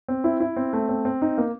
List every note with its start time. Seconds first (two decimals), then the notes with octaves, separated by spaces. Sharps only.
0.08 C4
0.24 E4
0.40 E4
0.57 C4
0.73 A3
0.89 C4
1.05 C4
1.22 D#4
1.38 A#3